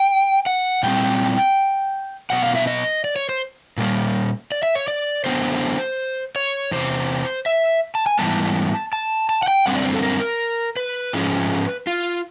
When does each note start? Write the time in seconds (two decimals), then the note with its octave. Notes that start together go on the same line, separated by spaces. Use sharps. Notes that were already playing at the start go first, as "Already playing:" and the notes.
Already playing: G5
0.46 F#5
0.83 A#2 G3 C4 G5
2.30 B2 F#3 B3 F#5
2.43 F5
2.55 E5
2.67 D#5
3.04 D5
3.16 C#5
3.29 C5
3.77 A#2 G3 A#3
4.52 D5
4.63 E5
4.75 C#5
4.88 D5
5.24 D3 F#3 B3 C5
6.36 C#5
6.71 E2 C3 C5
7.46 E5
7.95 A5
8.06 G#5
8.19 G#2 E3 G3 B3 A5
8.93 A5
9.29 A5
9.43 F#5
9.48 G5
9.66 F#2 D3 G3 C4 F#5
9.75 D5
9.85 C5
9.94 A4
10.02 A#4
10.76 B4
11.13 G#2 F3 G#3 C#4
11.87 F4